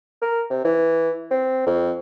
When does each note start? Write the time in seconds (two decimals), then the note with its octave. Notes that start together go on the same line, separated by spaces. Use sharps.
0.22 A#4
0.50 C3
0.64 E3
1.31 C4
1.66 F2